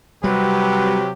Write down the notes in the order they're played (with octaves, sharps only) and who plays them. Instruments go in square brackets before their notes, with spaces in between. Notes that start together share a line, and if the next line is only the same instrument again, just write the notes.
[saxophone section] C3 F#3 [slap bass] G3 [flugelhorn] G4 [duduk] B4